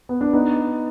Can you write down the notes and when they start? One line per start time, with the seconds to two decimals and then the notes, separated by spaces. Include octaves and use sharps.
0.09 B3
0.21 D4
0.33 B3 D#4